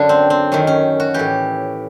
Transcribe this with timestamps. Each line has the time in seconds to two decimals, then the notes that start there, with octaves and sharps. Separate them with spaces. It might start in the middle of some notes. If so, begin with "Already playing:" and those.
Already playing: F#2 D3 D4
0.09 C4
0.30 C4
0.52 F#2 D#3 C#4
0.67 C#4
1.00 F#4
1.14 A2 E3 G4